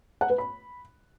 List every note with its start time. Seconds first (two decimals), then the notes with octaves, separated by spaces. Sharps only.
0.21 F#5
0.30 B4
0.38 B5